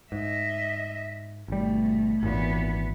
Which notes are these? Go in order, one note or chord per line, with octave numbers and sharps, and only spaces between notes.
G#2 D#5 E5
G#1 B2 G3 A3
G#1 D#2 A#2 E3 B3